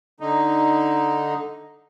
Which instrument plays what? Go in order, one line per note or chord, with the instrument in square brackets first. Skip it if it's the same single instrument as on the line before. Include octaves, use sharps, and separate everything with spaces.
[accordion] D3 D#4